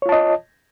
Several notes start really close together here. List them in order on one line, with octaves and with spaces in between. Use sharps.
C#5 F4 A5 D#5